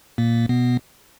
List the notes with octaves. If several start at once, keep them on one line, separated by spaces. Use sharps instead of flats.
A#2 A#3
B2 B3